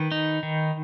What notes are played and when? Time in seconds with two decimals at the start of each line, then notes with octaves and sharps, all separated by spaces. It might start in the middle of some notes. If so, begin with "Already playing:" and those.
Already playing: D#3 B4
0.11 D#4
0.43 D#3